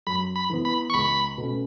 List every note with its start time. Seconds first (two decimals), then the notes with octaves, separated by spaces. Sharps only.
0.07 F#2 B5
0.36 B5
0.50 E3 B3
0.65 B5
0.90 C#6
0.94 C#2 B5
1.38 B2 A3 C#4